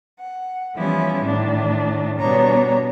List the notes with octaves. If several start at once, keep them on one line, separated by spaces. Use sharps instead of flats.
F#5
E3 F3 G3 B3 C#4 E4
A2 D#3 D4
B2 G3 B3 D4 C#5 A#5